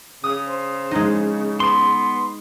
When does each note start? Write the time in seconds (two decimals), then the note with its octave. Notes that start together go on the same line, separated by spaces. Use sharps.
0.24 C#3 D#6
0.48 C5
0.91 G#3 D#4
1.60 B3 C6